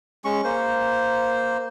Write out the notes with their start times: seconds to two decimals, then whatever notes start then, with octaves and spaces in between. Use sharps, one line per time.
0.25 G#3 C#4 C#6
0.44 A#3 C5